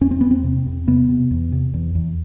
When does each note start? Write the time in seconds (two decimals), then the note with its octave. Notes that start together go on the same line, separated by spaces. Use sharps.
0.01 E2 C#4
0.11 C4
0.21 E2 B3
0.31 C4
0.44 C3
0.66 E2
0.87 C3 B3
1.09 C3
1.31 E2
1.52 C3
1.74 E2
1.95 E2